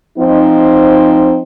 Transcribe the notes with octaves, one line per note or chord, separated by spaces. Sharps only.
F3 C4 D#4